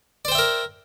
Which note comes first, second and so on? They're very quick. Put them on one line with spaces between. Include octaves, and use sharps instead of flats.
D5 C5 G5 E5 A#4